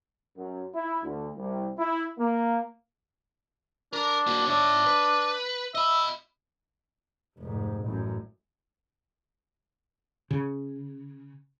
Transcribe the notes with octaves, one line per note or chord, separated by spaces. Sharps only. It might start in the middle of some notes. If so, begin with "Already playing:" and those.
F#2
E4
D2
C2
E4
A#3
D4 A#4
A#3 F#4
D4 C#5 E5
B4
D#5 E5 B5
F1 G#2
A1 F#2
C#3